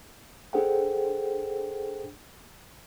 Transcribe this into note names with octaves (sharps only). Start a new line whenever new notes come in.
D4 G#4 A4 C5 F#5 G5